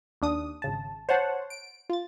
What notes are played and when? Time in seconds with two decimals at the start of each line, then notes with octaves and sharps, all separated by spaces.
0.22 D#2 D4 D#6
0.62 G#1 C#3 A5
1.09 C5 C#5 F#5 A5
1.50 D7
1.89 F4 A6